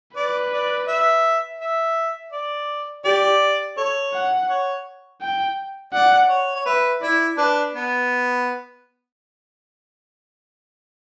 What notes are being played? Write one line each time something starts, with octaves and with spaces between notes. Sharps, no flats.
B4 D5
D5
E5
E5
D5
G4 D5
A4 C#5
F#5
C#5
G5
D5 F#5
C#5
C#5
B4 E5
E4 D5
D4 B4
B3